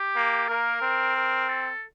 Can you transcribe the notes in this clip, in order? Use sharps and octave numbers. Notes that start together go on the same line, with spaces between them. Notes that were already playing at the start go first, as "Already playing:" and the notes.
Already playing: G4
A#3
A#3 A#4
C4
A#4
A4